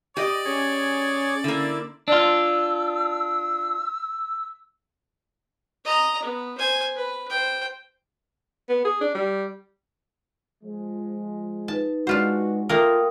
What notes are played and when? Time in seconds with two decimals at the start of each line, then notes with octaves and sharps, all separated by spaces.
0.17 G4 D5 D#5
0.46 C#4 G#4 C#5
1.44 D3 A#3 E4
2.08 D4 F4 E6
5.85 D#5 A#5
6.23 B3
6.58 C5 G#5
6.96 B4
7.29 C5 G5
8.69 B3
8.85 G#4
9.01 D4
9.15 G3
10.64 F3 G#3
11.68 D#4 B4 A5
12.07 G#3 D4 F4 F#4 C5
12.69 A3 A#3 F4 A#4 G5 D#6